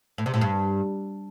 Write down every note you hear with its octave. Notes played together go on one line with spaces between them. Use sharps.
A2
C3
A2
G2